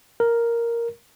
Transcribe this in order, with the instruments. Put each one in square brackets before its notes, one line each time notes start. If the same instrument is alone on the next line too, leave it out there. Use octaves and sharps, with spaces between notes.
[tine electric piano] A#4